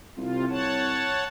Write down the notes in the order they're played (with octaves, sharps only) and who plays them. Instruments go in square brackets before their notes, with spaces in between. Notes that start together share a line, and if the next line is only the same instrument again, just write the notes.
[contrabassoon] C2 [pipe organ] C3 F4
[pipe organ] C#5 F#5 A5